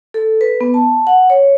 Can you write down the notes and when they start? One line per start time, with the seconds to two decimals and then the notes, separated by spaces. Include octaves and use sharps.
0.14 A4
0.41 B4
0.61 B3
0.74 A5
1.07 F#5
1.30 C#5